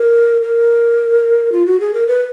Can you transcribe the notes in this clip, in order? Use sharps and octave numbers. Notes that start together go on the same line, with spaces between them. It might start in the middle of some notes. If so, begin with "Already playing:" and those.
Already playing: A#4
A#4
F4
F#4
G#4
A#4
B4